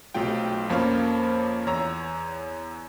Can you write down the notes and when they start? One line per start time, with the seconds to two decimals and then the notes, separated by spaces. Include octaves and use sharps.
0.14 B1 C3 F#3 A3 F4 G5
0.69 F2 F3 A#3 C#4 C#5 F5
1.67 E2 C#5 A#5 E6